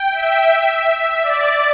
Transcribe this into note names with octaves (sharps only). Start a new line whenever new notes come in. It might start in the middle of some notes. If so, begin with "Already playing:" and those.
Already playing: G5
E5
E5
E5
D5